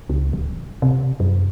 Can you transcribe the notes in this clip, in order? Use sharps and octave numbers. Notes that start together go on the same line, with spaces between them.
C#2
D1
C3
F#2